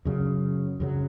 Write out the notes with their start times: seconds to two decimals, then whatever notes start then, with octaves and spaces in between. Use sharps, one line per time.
0.05 F#2 C#3 F#3
0.80 F#2 C#3 F#3